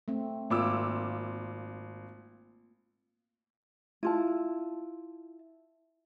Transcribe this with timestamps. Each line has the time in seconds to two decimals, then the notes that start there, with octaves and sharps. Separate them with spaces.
0.08 A3 C4
0.50 G#1 A#3 F4 D6 E6
4.03 E4 F4 A5